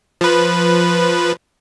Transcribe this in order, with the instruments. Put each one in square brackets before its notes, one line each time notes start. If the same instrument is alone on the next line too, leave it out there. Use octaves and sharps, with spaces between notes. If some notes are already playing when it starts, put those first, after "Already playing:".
[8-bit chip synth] F3 B4